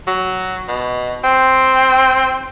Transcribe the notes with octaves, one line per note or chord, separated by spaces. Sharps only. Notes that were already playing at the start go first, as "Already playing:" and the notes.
F#3
B2
C4